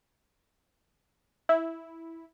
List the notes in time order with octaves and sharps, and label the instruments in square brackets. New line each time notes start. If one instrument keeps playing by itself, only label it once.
[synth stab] E4